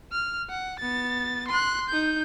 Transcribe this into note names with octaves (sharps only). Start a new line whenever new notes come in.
F6
F#5
B3 A6
C6 F#6
D#4 G6